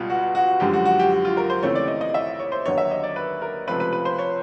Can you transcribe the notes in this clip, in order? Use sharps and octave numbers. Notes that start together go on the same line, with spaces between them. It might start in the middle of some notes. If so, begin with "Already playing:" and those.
Already playing: C#2 B2 G3 F4
F#4
F#4
F#2 D3 F3 G#3 G4
F#4
F#4
G4
F#4
F4
A#4
C5
D#2 C#3 E3 A3 C4 C#5
D5
D#5
D#5
E5
C#5
C5
D#2 D3 F#3 B3 C#5
E5
D#5
D5
B4
A#4
C#2 C3 F3 A3 C4 B4
B4
B4
C5
C#5